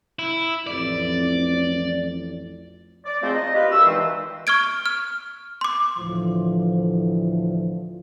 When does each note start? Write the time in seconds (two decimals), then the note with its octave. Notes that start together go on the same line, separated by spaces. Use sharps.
0.19 E4
0.67 A1 F2 D5
3.05 D5
3.22 F3 G#3 A3 C4 D#4 C5
3.33 D#5
3.54 F4 G4 B4
3.71 C2 G2 F#4 E6
3.84 C3 D#3 E3 G#3 C4
4.47 C#6 F6 G#6 D7
4.86 F6
5.61 C6 D6
5.98 D2 A2 E3 F3